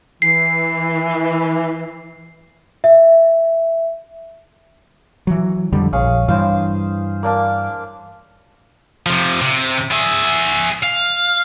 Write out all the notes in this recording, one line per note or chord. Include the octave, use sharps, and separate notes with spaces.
E3 C7
E5
E3 F#3
F2 D3 G3
A#1 G#4 C#5 F5
G2 E3 C5 F5
A#3 D4 F5
C3 F3
C3
G#4 E5
F5